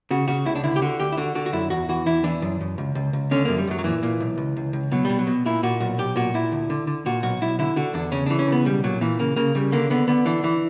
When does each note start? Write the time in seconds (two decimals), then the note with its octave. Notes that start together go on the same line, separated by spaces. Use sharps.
0.11 C#3 F#4
0.28 C#3 F#4
0.46 C#2 E4
0.56 D4
0.64 D3 E4
0.76 G4
0.82 D3 F#4
1.00 D2 G4
1.12 E4
1.17 D3 F#4
1.35 D3 F#4
1.46 F#4
1.53 F#2 E4
1.70 E2 F#4
1.89 E3 F#4
2.06 E2 E4
2.24 E3 D4
2.42 F#2
2.61 F#2
2.78 C#2
2.95 C#2
3.13 C#2
3.31 D3 C#4
3.45 F#2 A#3
3.58 G3
3.67 F#2 F#3
3.79 F#3
3.84 A#2 E3
4.03 A#2
4.20 B1
4.38 C#2
4.57 C#2
4.73 C#2
4.92 B2 F#3
5.05 B2 G3
5.19 F#3
5.27 B2
5.46 A#2 E4
5.63 A#2 F#4
5.80 B1 F#4
5.98 B1 G4
6.16 A#2 F#4
6.34 A#2 E4
6.52 D2
6.70 D3
6.87 D3
7.06 A#2 F#4
7.23 B1 F#4
7.42 B1 E4
7.59 D3 E4
7.76 D3 F#4
7.94 E2 D4
8.12 C#3 C#4
8.26 E3 D4
8.39 C#4
8.48 C#3 B3
8.65 B1 G3
8.84 A#2 F#3
9.01 A#2 E3
9.19 C#3 A#3
9.36 C#3 A#3
9.55 C#3 G3
9.72 D3 A#3
9.90 D3 B3
10.08 D3 B3
10.26 E3 D4
10.44 E3